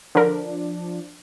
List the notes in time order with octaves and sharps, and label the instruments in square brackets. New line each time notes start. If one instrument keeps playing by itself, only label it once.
[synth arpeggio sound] D3 A#4 [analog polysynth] F3 D4